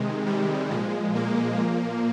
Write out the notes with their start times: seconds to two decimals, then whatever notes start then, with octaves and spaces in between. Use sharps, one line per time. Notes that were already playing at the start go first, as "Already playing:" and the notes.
Already playing: C3 D#3 G#3
0.27 G3
0.71 A#2 F3 G#3
1.15 A#3
1.60 A#2 F3